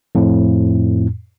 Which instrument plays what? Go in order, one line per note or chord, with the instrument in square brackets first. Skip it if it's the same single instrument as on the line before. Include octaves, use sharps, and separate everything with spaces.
[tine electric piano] F2 A2